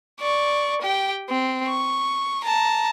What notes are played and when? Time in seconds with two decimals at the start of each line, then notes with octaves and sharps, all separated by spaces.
0.20 D5 C#6
0.81 G4 G5
1.29 C4
1.66 C#6
2.44 A5 A#5